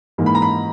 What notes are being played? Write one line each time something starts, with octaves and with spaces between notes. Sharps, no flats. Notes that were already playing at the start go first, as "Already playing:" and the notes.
G#2 E3 A#3
B5
A#5
B5